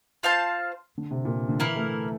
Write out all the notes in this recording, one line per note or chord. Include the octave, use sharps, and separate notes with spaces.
F4 C5 F5 A5
D3
C3
A#2
D3
E3 A#3 E4 A#4
A3